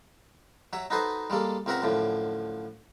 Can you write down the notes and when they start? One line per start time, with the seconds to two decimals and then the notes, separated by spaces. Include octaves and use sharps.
0.73 F#3 C#5 E5
0.90 D#4 F#4 A4 B4 C5 D#5
1.30 G3 G#3 A#3 A4
1.66 C#2 C4 A#4 E5 F#5 A#5
1.82 F#2 A2 D3 F3